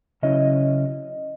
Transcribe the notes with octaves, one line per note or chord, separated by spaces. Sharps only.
C#3 F#3 C#4 E4 D#5